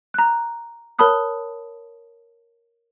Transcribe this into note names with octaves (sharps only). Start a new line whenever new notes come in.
A#5 F#6
A#4 C#5 A5 B5 D#6 F#6